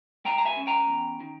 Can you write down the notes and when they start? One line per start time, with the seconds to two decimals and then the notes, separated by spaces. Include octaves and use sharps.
0.25 G#3 G5 A#5
0.38 A#5
0.45 E5 G#5
0.56 C#4
0.67 G5 A#5
0.89 E2
1.20 D#3